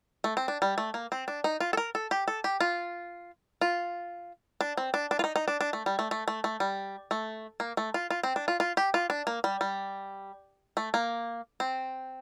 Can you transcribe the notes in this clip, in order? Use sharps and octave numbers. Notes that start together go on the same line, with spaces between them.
A3
C4
D4
G3
A3
A#3
C4
D4
D#4
F4
A4
A#4
A4
G4
A4
G4
F4
F4
D4
C4
D4
D4
F4
D#4
D#4
D4
D4
A3
G3
A3
A3
A3
A3
G3
A3
A#3
A3
F4
F4
C4
D4
F4
F4
G4
F4
D4
A#3
G3
G3
A3
A#3
C4